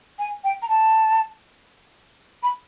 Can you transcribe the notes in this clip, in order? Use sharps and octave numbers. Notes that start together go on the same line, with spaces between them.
G#5
G5
A#5
A5
B5